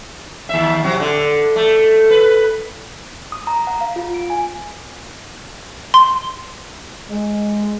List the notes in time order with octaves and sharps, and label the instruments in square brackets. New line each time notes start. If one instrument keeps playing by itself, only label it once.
[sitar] D#2 E5
C3 F#3
D3
A3
B4
[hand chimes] D#6
A#5
F#5
F5
F4
D7
G#5
[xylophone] C6
[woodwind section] G#3